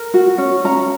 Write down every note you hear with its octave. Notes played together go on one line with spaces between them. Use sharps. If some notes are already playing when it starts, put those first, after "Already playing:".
Already playing: A#4
F#4
C#4
C#4 A#5